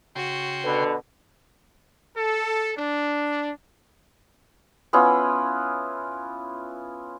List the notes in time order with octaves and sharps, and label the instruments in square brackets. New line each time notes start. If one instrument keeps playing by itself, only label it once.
[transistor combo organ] C#3 G5 C6 [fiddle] F#4
[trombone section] B2 D3 [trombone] B4
[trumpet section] A4
D4
[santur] B3 C#4 E4 F4